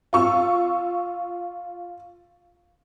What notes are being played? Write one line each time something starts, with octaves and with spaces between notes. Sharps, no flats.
F4 C#6 E6